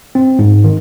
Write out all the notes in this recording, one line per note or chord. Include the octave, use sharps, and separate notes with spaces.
C4
G#2
D#3